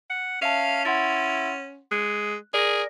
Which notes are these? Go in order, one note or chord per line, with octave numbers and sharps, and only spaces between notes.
F#5
C#4 E5 F5 A5
E4 F#5 C6 A6
G#3 F#6
G#4 A#4 D5 A#6